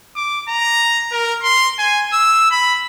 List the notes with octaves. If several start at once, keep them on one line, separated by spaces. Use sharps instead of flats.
D6
A#5
A#4
C6
G#5
E6
B5